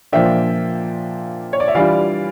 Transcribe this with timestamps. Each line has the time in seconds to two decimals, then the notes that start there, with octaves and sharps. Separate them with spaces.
0.12 A#2 F3 A#3 D4 E5 G5
1.53 C#5
1.60 D5
1.68 E5
1.75 E3 G3 D4 F4 D5 F5